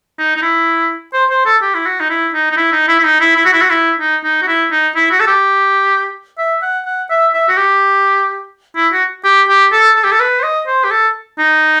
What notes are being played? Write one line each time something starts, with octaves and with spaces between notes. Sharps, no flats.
D#4
D#4
E4
C5
C5
A4
G4
E4
F#4
D#4
E4
D#4
D#4
E4
D#4
E4
E4
D#4
E4
E4
F#4
E4
F#4
E4
D#4
D#4
F#4
E4
D#4
E4
F#4
A4
G4
E5
F#5
F#5
E5
E5
F#4
G4
E4
F#4
G4
G4
A4
A4
G4
A4
B4
C5
D#5
C5
G4
A4
D#4